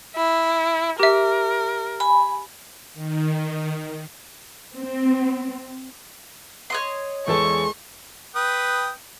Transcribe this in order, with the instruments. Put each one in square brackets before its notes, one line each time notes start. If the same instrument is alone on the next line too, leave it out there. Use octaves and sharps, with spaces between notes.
[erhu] E4
[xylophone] G4 E5 [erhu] A#4
[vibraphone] G#5 B5
[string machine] D#3
[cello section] C4
[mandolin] C#5 D#5 C6
[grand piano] E2 A4 A5 [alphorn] G#3 [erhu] C#6
[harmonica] B4 G5 D#6